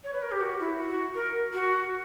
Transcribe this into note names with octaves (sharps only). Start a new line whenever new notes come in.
C#5
B4
A#4
G4
F#4
E4
F#4
A#4
F#4